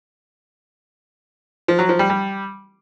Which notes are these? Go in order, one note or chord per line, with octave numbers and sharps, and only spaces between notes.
F3
F#3
F3
G3
G3